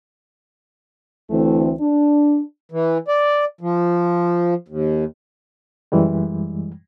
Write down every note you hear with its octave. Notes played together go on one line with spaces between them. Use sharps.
D2 E3 A3 C4 E4
D4
E3
D5
F3
D#2
F#2 E3 G3 G#3